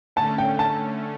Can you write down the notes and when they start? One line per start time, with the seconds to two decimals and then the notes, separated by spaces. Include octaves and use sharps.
0.16 D3 A3 C#4 A5
0.38 G5
0.59 A5